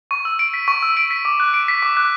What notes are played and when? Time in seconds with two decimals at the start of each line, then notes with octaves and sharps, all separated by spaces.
0.11 C#6
0.25 E6
0.39 D7
0.54 B6
0.68 C#6
0.82 E6
0.97 D7
1.11 B6
1.25 D6
1.40 F#6
1.54 D7
1.68 B6
1.83 D6
1.97 F#6